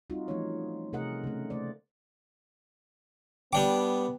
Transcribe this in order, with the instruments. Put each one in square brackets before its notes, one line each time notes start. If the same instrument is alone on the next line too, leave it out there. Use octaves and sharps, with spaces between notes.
[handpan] G3 C4 D#4 F4 F#4
E3 F3 A3 C#4 D#4 C#5
C3 A3 G#4 A#4 D#5 F#5
C#3 A3
A3 A#3 C5 D5
[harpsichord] G3 D4 D6 [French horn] B3 [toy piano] G5 A5